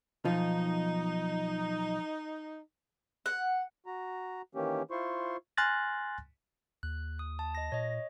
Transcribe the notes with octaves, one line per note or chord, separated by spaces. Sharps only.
B1 F3 D#4
F#5
F#4 A#5
D#3 E3 A#3 C#4 G4
E4 F4 C5 C6 C#6
G#5 C6 F6 F#6 A6 A#6
D#2 F#6
D#6
A5
D#5 A#6
A#2 C#5 D#5